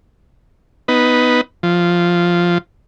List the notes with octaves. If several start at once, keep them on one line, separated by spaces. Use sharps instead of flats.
B3 D#4 B4
F3